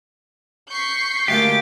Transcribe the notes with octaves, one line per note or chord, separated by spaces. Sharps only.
C#6 G6 B6 C7
D2 G#3 A#3 G4 A6